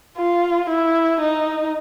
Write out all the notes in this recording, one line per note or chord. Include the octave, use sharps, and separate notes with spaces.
F4
E4
D#4